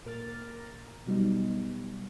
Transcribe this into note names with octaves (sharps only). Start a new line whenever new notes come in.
A#2 A#4 D6 F6 A6
A#5
B2 F#3 G3 B3 D#4